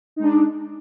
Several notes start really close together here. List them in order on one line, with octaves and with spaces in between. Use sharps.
D#4 G#3 D4